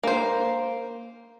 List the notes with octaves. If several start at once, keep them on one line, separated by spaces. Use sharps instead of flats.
A#3 C5